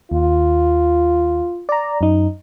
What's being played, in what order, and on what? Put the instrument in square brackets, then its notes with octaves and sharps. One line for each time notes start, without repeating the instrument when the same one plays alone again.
[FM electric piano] D#2 [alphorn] F4
[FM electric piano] D5 A#5
F#2 D#4